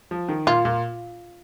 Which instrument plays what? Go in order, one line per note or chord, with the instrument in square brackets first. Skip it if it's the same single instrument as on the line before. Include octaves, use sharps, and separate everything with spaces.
[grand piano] F3
D#3
[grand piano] A#2 [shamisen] F4
[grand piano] A#2